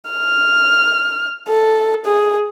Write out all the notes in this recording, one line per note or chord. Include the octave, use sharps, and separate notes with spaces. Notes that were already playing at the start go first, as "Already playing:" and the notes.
F6
A4
G#4